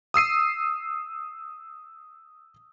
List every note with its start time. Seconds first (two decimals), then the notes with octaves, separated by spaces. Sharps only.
0.14 D#6 E6 C7 D#7